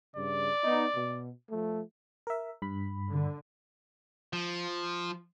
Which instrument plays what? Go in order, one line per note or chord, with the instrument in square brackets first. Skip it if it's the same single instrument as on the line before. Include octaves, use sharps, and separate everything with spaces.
[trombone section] G2 C#3 [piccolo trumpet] D5
[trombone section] B3 D#4
B2
F3 A3
[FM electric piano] A#4 E5
G2 B5
[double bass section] D3
[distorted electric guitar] F3